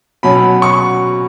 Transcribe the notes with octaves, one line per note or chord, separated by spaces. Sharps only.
B2 F#3 C#4 B5
C#6